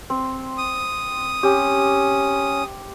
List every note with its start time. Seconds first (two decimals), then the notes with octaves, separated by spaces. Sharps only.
0.10 C4
0.58 D#6
1.43 C#4 G4